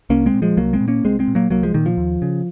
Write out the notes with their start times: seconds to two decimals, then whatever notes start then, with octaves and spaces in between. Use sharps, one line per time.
0.10 C2 A#3 C#4
0.26 G#3 C4
0.34 A#2
0.42 F3 G#3
0.57 C2 F#3 A#3
0.73 G#3 C4
0.81 A#2
0.88 A#3 C#4
1.04 C2 G#3 C4
1.19 G#3 C4
1.28 A#2
1.35 F#3 A#3
1.50 C2 F#3 A#3
1.63 F3 G#3
1.74 A#2 D#3
1.86 F3
1.97 D#2
2.22 C#3